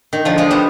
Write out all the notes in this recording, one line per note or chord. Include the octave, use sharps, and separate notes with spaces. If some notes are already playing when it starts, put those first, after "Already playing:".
D#3
D3 F3
F3 G#3
G3 B3